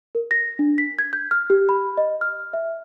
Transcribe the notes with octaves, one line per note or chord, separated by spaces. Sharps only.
A#4
A#6
D4
B6
G#6
G6
F6
G4
B5
D#5
F6
E5